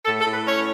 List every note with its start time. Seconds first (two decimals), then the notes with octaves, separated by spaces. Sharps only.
0.05 A2 A4
0.20 A4
0.27 A2
0.33 B4
0.47 C#4 C#5